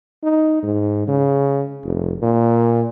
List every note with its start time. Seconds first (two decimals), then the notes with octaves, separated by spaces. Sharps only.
0.23 D#4
0.63 G#2
1.08 C#3
1.84 F1
2.22 A#2